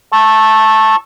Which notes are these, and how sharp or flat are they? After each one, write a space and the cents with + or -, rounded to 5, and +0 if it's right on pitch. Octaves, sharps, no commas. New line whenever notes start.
A5 +0 C#6 -20 E6 +0